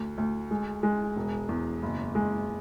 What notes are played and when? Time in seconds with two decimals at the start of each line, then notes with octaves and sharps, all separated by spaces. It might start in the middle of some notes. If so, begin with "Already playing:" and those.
Already playing: D2
0.18 D2
0.51 G#3
0.83 G#3
1.16 E1
1.49 E2
1.82 F#1
2.15 G#3